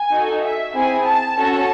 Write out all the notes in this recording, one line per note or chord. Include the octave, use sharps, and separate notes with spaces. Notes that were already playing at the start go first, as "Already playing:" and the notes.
Already playing: G#5
D#4 F#4 A4
E5
C4 E4 G#4 G#5
A5
C#4 F#4 A4 A5